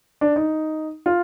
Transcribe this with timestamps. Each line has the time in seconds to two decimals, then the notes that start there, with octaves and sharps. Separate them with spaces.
0.21 D4
0.36 D#4
1.06 F4